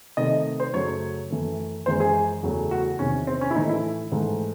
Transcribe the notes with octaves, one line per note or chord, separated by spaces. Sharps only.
C3 D#3 A3 D#5
C5
F#2 C#3 F#3 A3 C#5
F#2 E3 A3
F#2 E3 G#3 C5
G#4
E2 C#3 F#3 A3
F#4
E2 C3 D#3 C#4
C4
C#4
E4
A2 E3 A3 D#4
E4
G#2 E3 A3